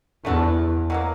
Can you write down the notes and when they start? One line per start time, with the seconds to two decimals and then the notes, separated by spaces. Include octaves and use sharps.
0.25 E2 A3 D4 F#4 A4
0.90 B2 F#3 A#3